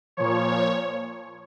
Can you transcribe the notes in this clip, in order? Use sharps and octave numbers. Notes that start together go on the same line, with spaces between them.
A#2 F3 C#5